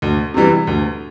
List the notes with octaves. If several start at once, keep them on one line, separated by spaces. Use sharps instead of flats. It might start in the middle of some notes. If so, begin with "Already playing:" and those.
D2
C3 E3 G3
D2